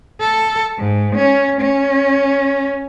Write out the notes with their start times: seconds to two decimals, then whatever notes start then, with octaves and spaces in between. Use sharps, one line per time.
0.20 A4
0.78 G#2
1.16 C#4
1.61 C#4